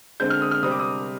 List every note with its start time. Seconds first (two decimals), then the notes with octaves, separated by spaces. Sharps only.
0.20 D3 G#3 C4 G6
0.30 F6
0.42 D#6
0.51 F6
0.62 C3 G3 C4 D#6
0.71 D6
0.79 D#6